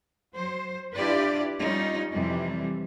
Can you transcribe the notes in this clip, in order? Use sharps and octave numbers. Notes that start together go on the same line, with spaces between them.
F#3 C5
D4 E4 F4 G4 B4 D5
G3 C#4 D#4 F4
F2 C3 E3 G3